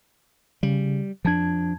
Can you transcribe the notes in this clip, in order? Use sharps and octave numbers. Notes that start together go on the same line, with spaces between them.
C#3 G3
F2 F3 D4 A5 G#6